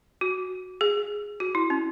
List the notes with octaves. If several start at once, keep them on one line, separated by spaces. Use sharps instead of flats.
F#4
G#4
F#4
E4
C#4